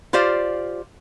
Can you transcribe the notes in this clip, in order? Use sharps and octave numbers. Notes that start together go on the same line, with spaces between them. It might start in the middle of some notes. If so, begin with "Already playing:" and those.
F4 G4 C5 D5 F5